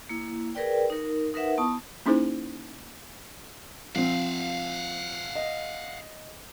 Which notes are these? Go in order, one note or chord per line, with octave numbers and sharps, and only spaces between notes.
A#3 E4
G#4 A#4 B4 D5 G5
D#4 A#4
D#4 A#4 B4 E5 F#5
B3 E4 A5 C#6 D#6
A#3 C#4 D#4 E4 G#4 C5
F3 C4 F5 F#5
D#5